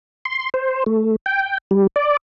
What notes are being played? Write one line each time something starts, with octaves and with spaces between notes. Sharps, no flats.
C6
C5
A3
G5
G3
D5